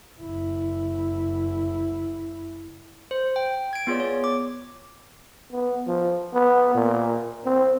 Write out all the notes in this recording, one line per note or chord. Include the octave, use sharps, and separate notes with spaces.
F#1 E4
C5
G5
G#6 D7
B3 F4 G#4 C#5 D5
C#5
D6
B3
F3
B3
A#2
C4